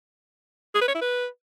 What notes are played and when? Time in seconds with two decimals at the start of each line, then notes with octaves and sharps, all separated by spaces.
0.75 G#4
0.81 B4
0.88 C#5
0.95 E4
1.01 B4